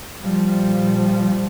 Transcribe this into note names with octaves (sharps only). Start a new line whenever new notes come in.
A#2 F3 G3